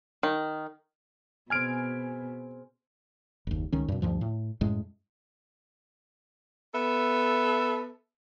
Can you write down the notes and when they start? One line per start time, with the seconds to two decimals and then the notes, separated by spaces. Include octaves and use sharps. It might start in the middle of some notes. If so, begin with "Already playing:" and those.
0.23 D#3
1.50 B2 C4 G#4 G#5 F6 G#6 D7
3.47 F#1 D#2
3.72 C#2 D#3 C#4
3.88 F#2 B2
4.02 D2 G2 F3
4.21 A2
4.61 F#2 A2 G#3
6.74 B3 A4 E5